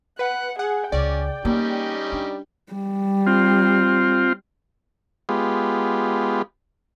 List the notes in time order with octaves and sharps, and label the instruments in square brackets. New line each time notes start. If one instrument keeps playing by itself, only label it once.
[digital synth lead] B4 [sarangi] F#5
[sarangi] G#4 [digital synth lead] F#5
[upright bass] C#2 [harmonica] C#4 [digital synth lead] D5 [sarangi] G5
[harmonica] G3 C#4 D#4 [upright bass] A#3
[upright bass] D4
[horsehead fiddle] G3
[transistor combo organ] C4 F4
G#3 B3 F4 G4